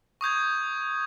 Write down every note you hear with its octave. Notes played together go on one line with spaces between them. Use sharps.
C#6 D#6 G6 G#6